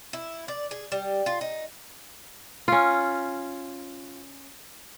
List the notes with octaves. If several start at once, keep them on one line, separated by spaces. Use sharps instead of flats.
E4
D5
G#4
G3
F4
D#4
C#4 F4